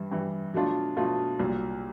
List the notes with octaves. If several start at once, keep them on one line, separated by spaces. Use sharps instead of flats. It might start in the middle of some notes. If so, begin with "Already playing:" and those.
Already playing: G2 E3 G3
G2 E3 G3
B2 F#3 A3 D4 F4
B2 F#3 A3 D4 F4
C2 A#2 F#3